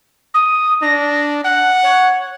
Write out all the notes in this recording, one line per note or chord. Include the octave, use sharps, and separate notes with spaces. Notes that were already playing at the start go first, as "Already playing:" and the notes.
D#6
D4 A#6
F#5 F#6
C#5